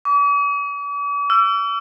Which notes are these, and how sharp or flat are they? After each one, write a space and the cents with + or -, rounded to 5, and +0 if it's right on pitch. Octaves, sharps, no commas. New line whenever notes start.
D6 -45
E6 +35